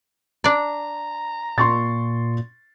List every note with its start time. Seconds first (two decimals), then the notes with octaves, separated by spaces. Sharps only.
0.44 D4 D5 A#5
1.58 A#2 C6 C#6 A6